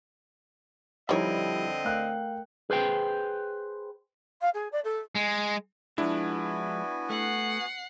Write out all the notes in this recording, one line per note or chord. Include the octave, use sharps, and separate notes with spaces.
D3 D#3 F3 G3 C4 E4 C#5 D#5
A3 A#4 F5 G5 F#6
G#4 B4 C5 G5
F5
G#4
D5
A4
G#3
F3 G#3 B3 D4 E4 F#4 G#5
A3 F#5 C7